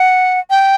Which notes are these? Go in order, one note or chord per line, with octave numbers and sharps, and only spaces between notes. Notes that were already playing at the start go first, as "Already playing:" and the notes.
Already playing: F#5
G5